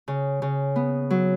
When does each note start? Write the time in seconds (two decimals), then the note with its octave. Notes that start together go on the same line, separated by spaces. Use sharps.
0.08 C#3
0.42 C#3
0.76 B3
1.10 F#3